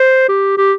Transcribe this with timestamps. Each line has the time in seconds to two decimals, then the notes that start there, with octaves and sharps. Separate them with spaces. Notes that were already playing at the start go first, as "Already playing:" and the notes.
Already playing: C5
0.29 G4
0.58 G4